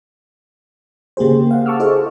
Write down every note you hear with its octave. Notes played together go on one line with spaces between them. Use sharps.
C#3 A#3 G4 G#4 C5
F5 F#5
A5 C#6 D6 E6 F6
E4 G#4 A4 C5 D#5